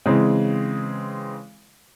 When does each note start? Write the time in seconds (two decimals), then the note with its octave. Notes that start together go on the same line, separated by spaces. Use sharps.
0.06 C#3 E3 G#3 C4